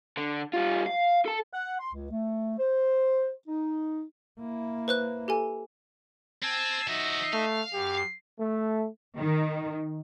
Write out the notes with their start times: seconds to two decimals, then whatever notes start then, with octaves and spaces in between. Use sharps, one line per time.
0.17 D3
0.54 G3 F4
0.86 F5
1.25 A4 A5
1.53 F#5
1.80 C6
1.94 C#2
2.11 A3
2.59 C5
3.48 D#4
4.40 A#3 E4
4.88 B4 C5 F#6
5.28 G4 A4 G#5
6.43 C4 G#5 A5 E6
6.88 F3 D#4 F#4 D#5 E5
7.33 A3 F5
7.73 F#2 G4
8.40 A3
9.18 D#3